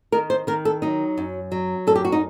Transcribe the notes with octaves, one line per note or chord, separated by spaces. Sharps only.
D#3 A#4
C5
D#3 A#4
A4
F#3 D#4
F#2
F#3
F#2 A4
G4
F#4
D#4